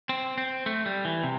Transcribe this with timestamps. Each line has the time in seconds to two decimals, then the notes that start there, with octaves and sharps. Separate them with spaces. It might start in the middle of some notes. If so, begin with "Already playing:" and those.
0.09 C4
0.38 C4
0.66 A3
0.86 G3
1.05 E3
1.24 C3